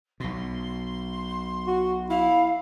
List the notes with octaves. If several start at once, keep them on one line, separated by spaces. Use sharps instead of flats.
B1 B2 C6
F#4
E4 F5